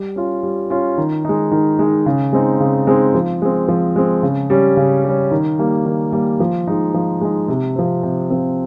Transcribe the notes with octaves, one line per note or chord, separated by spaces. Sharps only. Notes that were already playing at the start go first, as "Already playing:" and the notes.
Already playing: G3
C#4 F4
G3
C#4 F4
D#3
G#3 D#4
D#3
G#3 D#4
C#3
G#3 C4 D#4
C#3
G#3 C4 D#4
F3
G#3 C4
F3
G#3 C4
C#3
G3 C#4
C#3
G3 C#4
D#3
G3 A#3
D#3
G3 A#3
F3
G#3 D#4
F3
G#3 D#4
C3
F3 C4
C3
F3 C4